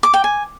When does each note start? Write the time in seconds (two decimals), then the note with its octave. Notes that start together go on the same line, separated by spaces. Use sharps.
0.03 D6
0.14 G5
0.24 G#5